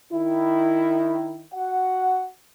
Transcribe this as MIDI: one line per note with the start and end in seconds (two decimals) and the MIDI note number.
0.12 1.45 51
0.12 1.45 64
1.53 2.27 66
1.53 2.27 78